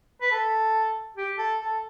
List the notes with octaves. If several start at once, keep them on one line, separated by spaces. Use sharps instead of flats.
B4
A4
G4
A4
A4